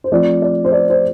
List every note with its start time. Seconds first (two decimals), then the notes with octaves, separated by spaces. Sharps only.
0.04 C5
0.12 F3 A3 C4 F4 D5
0.42 D5
0.65 C5
0.72 D5
0.90 C5